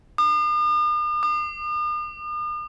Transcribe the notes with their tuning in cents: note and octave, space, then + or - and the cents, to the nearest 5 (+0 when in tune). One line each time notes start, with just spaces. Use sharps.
D#6 -45
D#6 -45